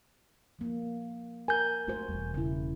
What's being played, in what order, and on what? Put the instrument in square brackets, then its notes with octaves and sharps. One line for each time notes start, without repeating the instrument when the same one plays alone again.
[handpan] F3 A#3
[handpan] A#4 [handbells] G#5 G6
[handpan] A3 F#4 C5 [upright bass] D#4
[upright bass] E1 E2 [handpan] G3
[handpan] C#3 E4